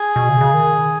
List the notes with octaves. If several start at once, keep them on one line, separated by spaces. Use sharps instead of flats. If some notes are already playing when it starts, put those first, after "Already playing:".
Already playing: G#4
B2
C#3
C#3
D#3